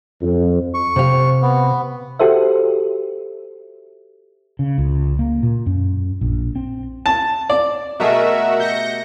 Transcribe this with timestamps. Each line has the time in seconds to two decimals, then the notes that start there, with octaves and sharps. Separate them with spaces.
0.22 F2
0.74 C#6
0.96 C3 F5
1.42 B3
2.19 F#4 G4 A4 C5 E5
4.59 C#3
4.78 C#2
5.19 A#3
5.43 A#2
5.66 F#2
6.21 A#1
6.56 C4
7.06 A5
7.50 D5
8.00 B2 A3 F#4 G#4 A#4 D#5 E5
8.60 G4 G6 A#6 C#7